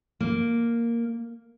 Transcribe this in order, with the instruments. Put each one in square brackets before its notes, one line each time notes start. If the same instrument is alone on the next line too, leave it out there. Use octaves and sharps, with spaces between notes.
[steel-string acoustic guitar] A#3